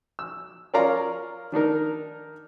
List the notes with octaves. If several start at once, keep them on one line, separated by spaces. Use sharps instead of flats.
E6
C#4 F4 A#4 D5 F5 A#5
D#3 D4 D#4 A#4